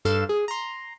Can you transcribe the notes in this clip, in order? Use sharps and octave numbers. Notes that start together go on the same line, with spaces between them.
G2 A4 F5 E7
G#4
A#5 C6